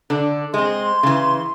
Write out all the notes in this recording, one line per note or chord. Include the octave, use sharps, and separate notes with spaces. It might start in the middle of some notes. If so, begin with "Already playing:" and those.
D3 D4
G#3 C4 C6
C#3 E3